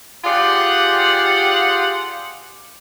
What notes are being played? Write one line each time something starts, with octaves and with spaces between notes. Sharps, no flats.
F4 G4 G#4 D5 F#5